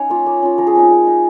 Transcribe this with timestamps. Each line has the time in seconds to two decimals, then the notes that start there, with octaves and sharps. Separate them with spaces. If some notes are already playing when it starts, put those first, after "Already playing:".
Already playing: C#4 D#4 C#5 D#5 F5
0.10 A#3 F4
0.26 A#3
0.42 C#4 F4
0.58 F3 A#4
0.67 G#4
0.75 C4 D#4 A#4
0.91 G#3
1.07 D#4